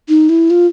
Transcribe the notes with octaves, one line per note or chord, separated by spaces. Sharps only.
D#4
E4
F4